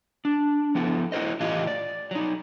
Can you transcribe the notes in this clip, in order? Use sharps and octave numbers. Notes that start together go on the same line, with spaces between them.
D4
F3 B3 E4 A4
E4 F#4 A#4 C5 D#5
A2 E3 F4 G4 D#5 F5
D5
F#3 D#4